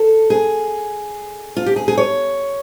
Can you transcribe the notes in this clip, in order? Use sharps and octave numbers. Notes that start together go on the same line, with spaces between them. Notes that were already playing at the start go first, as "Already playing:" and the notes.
Already playing: A4
G#4
F4
G4
G#4
G#4
C#5